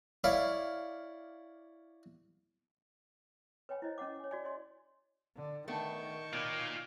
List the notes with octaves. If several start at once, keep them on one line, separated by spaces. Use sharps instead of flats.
E4 C#5 D5 F5
B4 C#5 G5 G#5 B5
E4 C5 C#5 D#5
C#4 D#5 F#5 D6
C#5 G#5
F#4 D5 G#5
C#5 D#5 G#5 C6
D3
D#3 A3 B3 D4 G5 A5 C#6
B2 D#4 F4 C#5 D5 F5